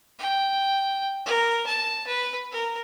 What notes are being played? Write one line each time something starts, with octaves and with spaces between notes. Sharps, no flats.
G5
A#4
A5
B4
A#4